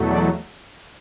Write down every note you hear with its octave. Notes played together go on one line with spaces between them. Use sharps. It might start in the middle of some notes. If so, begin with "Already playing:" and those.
Already playing: E2 B2 F#3 A3
D5